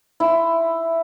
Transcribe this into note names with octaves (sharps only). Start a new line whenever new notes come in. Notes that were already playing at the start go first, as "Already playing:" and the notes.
E4 C6